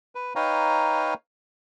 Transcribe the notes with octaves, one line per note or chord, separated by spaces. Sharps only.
B4
D#4 B4 C#5 F5 G5 A#5